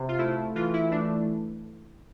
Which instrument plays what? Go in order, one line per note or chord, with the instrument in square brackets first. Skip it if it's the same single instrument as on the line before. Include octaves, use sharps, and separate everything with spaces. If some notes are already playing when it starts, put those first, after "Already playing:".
Already playing: [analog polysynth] C3
F4
A3 E4
E3 F4
E4
A3 D4